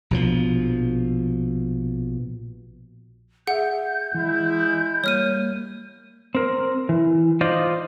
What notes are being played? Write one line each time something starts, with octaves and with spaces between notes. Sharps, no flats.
A#1 B2 F3
G#4 E5 F#5 G6
E3 G#3 E4
G3 A#3 C#5 F6 D#7
C4 A#4
E3
D#4 F4 C5 D5 D#5